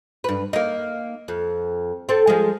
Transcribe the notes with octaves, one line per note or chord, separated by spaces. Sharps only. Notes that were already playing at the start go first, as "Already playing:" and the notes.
G2 B4
A#3 D#4
F2
C4 A4
F3 G#3